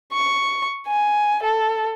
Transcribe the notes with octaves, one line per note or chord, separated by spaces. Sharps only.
C#6
G#5
A4